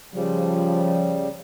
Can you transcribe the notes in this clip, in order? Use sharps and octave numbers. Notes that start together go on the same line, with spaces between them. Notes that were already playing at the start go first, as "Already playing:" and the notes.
C#3 F3 G3